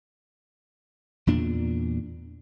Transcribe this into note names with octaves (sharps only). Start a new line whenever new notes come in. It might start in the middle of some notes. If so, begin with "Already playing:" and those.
E2 A#2 D4